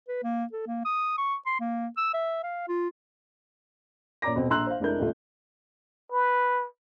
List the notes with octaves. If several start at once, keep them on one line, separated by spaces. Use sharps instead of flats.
B4
A#3
A4
A#3
D#6
C#6
C6
A#3
E6
E5
F5
F4
A#2 C#4 D5 A#5 D6 A#6
D#1 B2 C4
A#1 A#5 C6 E6 F#6 F#7
C5 F5
F1 G#3 D4 E4 A#4 G6
D#1 A1 D3 A3 F4
B4